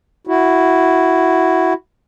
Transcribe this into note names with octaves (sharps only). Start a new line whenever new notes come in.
E4 F#4